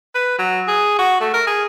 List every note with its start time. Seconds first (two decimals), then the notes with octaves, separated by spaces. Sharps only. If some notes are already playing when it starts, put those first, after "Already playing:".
0.15 B4
0.39 F#3
0.68 G#4
0.98 F#4
1.20 A3
1.34 A#4
1.47 G#4